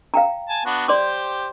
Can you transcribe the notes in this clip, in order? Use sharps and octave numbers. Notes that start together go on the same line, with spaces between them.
F5 G5 A#5
G#5 A5
B3 D4 F#4
G4 C5 D5 C6 D6